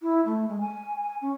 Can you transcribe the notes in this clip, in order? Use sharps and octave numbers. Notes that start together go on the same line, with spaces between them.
E4
A3
G#3
G#5
G#5
C#4